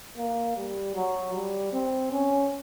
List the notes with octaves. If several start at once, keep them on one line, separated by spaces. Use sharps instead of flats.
A#3
G3
F#3
G3
C4
C#4